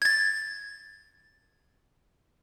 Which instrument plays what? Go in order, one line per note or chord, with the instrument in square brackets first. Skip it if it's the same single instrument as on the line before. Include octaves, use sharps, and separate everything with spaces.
[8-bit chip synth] G#6 A6